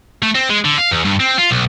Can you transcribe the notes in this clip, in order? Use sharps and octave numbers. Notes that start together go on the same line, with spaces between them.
A3
C4
G#3
D3
F5
E2
G2
C4
F4
B1